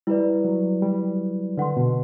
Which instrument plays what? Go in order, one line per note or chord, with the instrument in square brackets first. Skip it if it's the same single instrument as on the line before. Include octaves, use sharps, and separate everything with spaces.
[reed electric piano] G3 [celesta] E4 B4 D5
[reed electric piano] F#3
G3
[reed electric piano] D3 [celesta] B4 F#5 C6
[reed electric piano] B2